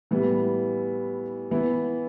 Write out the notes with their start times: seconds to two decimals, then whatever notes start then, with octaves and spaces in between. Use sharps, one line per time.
0.11 A2 E3 G3 B3 E4
1.51 E3 B3 E4